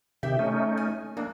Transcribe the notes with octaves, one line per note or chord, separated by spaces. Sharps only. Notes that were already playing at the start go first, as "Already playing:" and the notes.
C3 D#3 G4 E5
A3 C#4 D#4
G#5
F2 A#3 D4